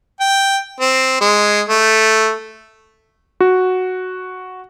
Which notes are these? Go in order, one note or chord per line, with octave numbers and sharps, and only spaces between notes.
G5
C4
G#3
A3
F#4